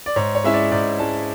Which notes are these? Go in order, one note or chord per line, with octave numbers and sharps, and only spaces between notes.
D5
G#2 C#5
C#5
G#3 C#4 E4 E5
D5
G#2 D5
G#3 C#4 E4 A5